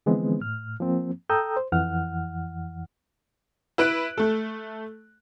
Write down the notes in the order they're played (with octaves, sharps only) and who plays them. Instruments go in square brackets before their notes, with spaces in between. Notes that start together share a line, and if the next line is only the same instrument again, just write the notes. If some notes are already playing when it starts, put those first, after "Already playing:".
[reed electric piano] D3 E3 F3 G#3 B3 C4
A2 F6
F3 A#3 C4
A4 G5 A#5 D#6 E6 G6
C5
F2 E3 F#5 F6
[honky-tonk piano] E4 B4 F#6 D7
A3 A4